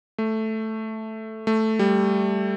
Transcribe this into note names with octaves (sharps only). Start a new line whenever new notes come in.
A3
A3
G3